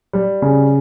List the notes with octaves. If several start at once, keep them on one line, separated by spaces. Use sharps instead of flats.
G3
C#3